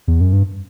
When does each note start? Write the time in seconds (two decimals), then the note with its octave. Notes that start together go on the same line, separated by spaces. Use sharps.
0.08 E2
0.21 F#2
0.33 G2